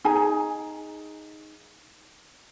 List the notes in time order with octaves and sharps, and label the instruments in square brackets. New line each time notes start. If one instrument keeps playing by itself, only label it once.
[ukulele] D#4 G#4 G#5 A#5